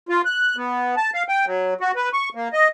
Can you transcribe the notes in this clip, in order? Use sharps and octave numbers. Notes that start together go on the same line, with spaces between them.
F4
F#6
B3
A5
F5
G5
F#3
F#4
B4
C#6
A#3
D#5